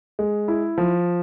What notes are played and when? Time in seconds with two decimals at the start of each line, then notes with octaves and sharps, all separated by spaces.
0.19 G#3
0.48 E4
0.78 F3